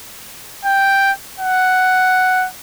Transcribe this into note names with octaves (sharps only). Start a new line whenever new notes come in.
G5
F#5